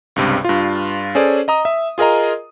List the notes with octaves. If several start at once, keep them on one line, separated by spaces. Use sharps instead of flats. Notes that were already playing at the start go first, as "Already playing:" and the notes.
C#2 G2 C3
G2 F4
C#4 G#4 A4 C5 D5
D#5 A#5 D#6
E5
F4 G#4 A#4 D#5 A#5